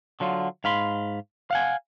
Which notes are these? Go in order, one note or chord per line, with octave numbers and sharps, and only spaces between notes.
D3 F#3 F4
G#2 F5 B5 C6
F5 F#5 G#5